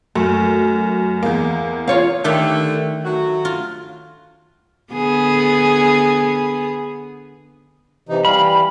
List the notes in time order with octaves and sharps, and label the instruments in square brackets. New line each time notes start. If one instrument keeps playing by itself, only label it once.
[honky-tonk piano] F#2 [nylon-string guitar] A3
[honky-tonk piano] E2 G#3 A#3
[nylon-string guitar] F4 C#5 F5
[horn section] D3 A3 [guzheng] D#3 G4
[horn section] F#3 A3 F#4
[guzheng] F4
[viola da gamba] D3 B3 G#4
[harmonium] C3 E3 D#4
[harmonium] E3 G3 F5 [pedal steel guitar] B5